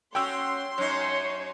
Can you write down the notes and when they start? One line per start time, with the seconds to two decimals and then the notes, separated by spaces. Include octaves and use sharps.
0.15 C#4 F#4 G5 C6 E6
0.78 F#2 D#4 C#5